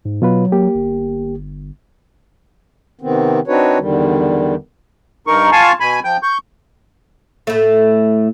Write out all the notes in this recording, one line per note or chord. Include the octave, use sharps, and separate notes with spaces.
G#2
B2 F#3 F4 B4
A#3 G4
G1
C3 D#3 B3 C4
C4 D4 D#4 F#4 B4 C#5
E2 D3 D#3 G3
G2 D#4 A#4 C#6
F4 F5 G#5 A5 C#6
B2 G#5 B5
F3 G5 G6
C#6 G6
A2 A3